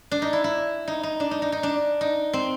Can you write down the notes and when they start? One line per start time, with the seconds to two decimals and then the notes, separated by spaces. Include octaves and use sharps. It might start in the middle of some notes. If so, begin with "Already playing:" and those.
0.11 D4
0.22 D#4
0.33 E4
0.44 E4
0.88 D#4
1.03 D#4
1.20 D4
1.31 D#4
1.42 D#4
1.52 D#4
1.63 D4
2.01 D#4
2.33 C4